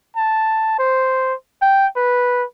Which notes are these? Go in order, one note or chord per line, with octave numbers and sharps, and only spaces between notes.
A5
C5
G5
B4